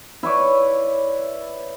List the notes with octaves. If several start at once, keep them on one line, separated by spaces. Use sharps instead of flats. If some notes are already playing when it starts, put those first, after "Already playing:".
E4 B4 C#5 D5